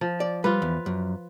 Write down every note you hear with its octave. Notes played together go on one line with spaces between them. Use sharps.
F3
D5
G3 F4 B4
E2
F#2